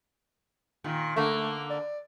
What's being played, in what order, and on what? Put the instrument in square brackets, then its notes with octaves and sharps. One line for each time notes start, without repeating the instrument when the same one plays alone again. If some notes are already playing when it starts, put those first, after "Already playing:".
[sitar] A#2 D#3
[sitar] D3 A#3 [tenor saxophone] A3
[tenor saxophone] D5